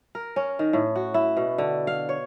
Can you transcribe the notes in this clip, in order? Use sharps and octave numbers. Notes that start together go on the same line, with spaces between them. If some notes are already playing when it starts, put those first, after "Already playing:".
A#4
C#4
D#3
A2
F#4
E4
B2
D3
F5
C#5